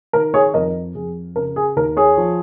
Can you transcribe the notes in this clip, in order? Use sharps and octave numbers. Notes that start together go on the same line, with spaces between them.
D#3 A#4
G#4 C#5
F2 A#4 D#5
F2 G#4
C#3 A#4
G#4
D#2 A#4
G#4 C#5
F3